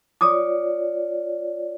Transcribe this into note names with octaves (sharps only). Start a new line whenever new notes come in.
F4 C#5 D5 D6 D#6